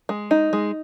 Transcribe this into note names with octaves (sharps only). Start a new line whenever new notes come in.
G#3
D#4
G#3